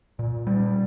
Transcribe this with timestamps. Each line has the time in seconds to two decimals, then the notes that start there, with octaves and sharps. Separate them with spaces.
0.19 A#2
0.47 G3